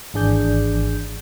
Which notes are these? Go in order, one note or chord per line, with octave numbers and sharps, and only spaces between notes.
G#1 E3 D4 G#4 D5 G6